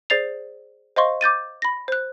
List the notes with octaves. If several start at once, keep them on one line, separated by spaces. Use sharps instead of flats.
G#4 C5 D5 A6 C7 F7
C5 D#5 F5 C6 C#6
D6 G6 A6 D#7
B5 A#6
C5 F#6